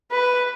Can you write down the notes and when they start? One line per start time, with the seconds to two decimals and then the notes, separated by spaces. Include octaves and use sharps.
0.11 B4